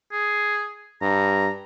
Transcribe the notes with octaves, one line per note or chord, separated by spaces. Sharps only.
G#4
G2 A#5